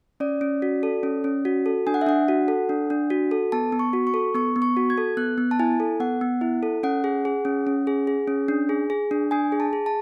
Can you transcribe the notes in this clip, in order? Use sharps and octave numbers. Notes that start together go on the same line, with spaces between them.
C#4 D5
C#4
F#4
A4
C#4
C#4
F#4
A4
D4 G#5
F#5
E5
D4 F#5
F#4
A4
D4
D4
F#4
A4
B3 A5
B3
C#6
F#4
C#6
A4
B3 C#6
B3
C#6
F#4
G#6
A4
B3 F#6
B3
A5
E4 G#5
A4
B3 F#5
B3
E4
A4
C#4 F#5
G#4
G#4
C#4
C#4
G#4
G#4
C#4
D4
G#4
G#4
D4
D4 G#5
G#4
A5
G#4
A5